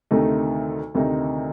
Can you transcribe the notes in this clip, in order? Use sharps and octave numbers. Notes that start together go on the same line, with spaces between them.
D2 C3 D#3 A3 D#4
D2 C3 D#3 A3 D#4